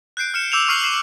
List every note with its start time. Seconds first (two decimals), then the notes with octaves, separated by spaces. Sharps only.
0.17 F#6 G6 C7 D7
0.34 F6 C#7 E7
0.52 D6 E6 G6 E7 F7
0.68 C#6 F6 C7 F#7
0.84 C7 E7